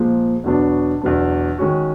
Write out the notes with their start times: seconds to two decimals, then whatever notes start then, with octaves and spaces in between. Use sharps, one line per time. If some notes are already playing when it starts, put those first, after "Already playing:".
Already playing: A#2 F3 G#3
0.44 E2 B2 F#3 B3 D4
1.02 E2 B2 F#3 B3 D4
1.58 D#3 G#3 C#4 F#4